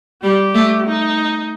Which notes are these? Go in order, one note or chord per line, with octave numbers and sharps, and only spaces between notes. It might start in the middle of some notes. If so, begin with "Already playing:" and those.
G3 G4
A3
D#4